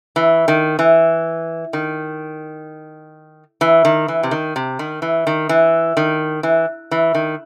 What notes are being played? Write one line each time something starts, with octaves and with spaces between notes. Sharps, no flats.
E3
D#3
E3
D#3
E3
D#3
E3
C3
D#3
C3
D#3
E3
D#3
E3
D#3
E3
E3
D#3